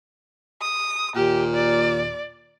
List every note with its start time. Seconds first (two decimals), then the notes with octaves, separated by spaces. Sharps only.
0.62 D#6
1.16 D#2 A#2 G4
1.55 D5